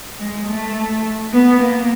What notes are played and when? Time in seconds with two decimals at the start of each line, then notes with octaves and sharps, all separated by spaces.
0.19 G#3
0.47 A3
1.32 B3
1.61 A#3